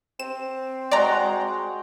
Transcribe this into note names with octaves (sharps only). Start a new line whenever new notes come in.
C4 E7
G#3 F#4 D5 G5 A#5